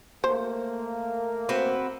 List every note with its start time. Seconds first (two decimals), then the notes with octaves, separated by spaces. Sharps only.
0.24 A3 A#3 C5
1.49 C4 F#4 B4